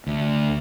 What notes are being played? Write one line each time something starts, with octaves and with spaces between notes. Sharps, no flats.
D2